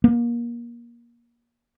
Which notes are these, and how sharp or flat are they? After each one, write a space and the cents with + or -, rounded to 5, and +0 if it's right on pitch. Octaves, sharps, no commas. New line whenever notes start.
A#3 +25